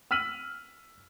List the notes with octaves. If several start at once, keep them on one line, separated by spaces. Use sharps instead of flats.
E6 F6 B6 D#7 F#7